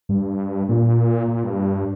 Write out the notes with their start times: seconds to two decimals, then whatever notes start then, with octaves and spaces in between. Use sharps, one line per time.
0.09 G2
0.69 A#2
1.28 A#2
1.44 G2